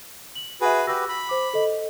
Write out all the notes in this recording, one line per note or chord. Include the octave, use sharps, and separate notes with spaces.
F#7
F#4 G#4 B4 E5 G#5
F#4 G4 B4 E6 A#6
B5
C5 D6
A4 D#5